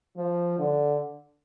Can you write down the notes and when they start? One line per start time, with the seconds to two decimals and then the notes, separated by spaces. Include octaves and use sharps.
0.17 F3
0.58 D3